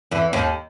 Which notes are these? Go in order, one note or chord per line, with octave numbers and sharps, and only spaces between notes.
E2 E3
D#2 D#3